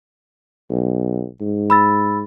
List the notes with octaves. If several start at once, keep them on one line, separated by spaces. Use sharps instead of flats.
B1
G#2
B5 E6 A6